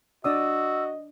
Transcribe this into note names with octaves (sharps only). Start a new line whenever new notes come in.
D4 F#4 D5 D#5 D#6 E6